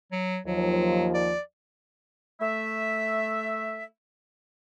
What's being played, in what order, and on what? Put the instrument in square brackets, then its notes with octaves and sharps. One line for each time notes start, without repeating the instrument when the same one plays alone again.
[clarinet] F#3
[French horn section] D#2 F3 [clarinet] F#3
[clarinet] D5
[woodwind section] A3 E5